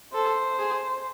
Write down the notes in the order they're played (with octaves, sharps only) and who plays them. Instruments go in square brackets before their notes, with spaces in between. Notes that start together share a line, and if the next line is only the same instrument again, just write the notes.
[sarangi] A4 [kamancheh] C5
[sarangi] G#4